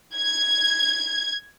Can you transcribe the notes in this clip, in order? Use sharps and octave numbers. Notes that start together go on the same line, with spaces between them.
G#6